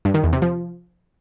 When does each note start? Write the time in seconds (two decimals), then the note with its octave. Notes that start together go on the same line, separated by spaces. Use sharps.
0.05 G2
0.14 D#3
0.24 E2
0.33 C3
0.42 F3